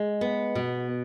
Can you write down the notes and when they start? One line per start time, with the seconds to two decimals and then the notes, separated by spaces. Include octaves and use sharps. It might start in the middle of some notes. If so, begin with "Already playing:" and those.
Already playing: G#3
0.21 B3
0.55 B2